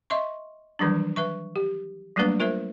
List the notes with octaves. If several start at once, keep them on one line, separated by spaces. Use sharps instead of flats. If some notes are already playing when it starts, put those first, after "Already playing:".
D#5 E5 C6 C#6
D#3 E3 F#3 G3 D4
B4 E5 C#6
G4
F#3 G3 A3 A#3 D4 B4
F4 A#4 C5 E5